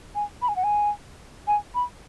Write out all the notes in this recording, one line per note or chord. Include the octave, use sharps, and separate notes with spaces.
G#5
B5
G#5
F#5
G#5
G#5
B5